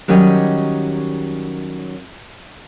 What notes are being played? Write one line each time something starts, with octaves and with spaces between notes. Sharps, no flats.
D#3 F#3 G3 C#4 G4 D#5